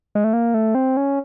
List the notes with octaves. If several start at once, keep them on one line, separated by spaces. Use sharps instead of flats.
G#3
A3
A#3
A3
C4
C#4